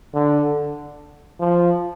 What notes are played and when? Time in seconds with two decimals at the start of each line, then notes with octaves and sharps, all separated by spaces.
0.14 D3
1.40 F3